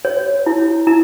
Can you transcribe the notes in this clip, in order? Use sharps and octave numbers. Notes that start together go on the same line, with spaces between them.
C#5
E4
E4 A#5